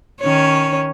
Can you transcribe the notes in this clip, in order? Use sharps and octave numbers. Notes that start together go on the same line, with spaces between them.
D#3 C#4 C#5